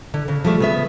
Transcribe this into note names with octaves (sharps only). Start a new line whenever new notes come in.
D3
C#3
F3 G3 A3
C#3 B3 E5